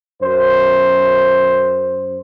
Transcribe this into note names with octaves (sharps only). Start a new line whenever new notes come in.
F#2 C5